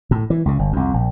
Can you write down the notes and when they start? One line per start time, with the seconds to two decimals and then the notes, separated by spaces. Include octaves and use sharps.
0.11 A2
0.30 E3
0.46 C#2 C#3
0.59 G1
0.73 C2 F2
0.94 A#1